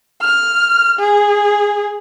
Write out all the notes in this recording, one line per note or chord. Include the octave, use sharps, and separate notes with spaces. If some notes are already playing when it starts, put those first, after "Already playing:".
F6
G#4